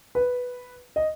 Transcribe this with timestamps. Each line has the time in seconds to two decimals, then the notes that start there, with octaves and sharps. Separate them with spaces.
0.15 B4
0.96 D#5